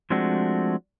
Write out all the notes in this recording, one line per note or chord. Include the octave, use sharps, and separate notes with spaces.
F3 G#3 A3 C4 D4 F#4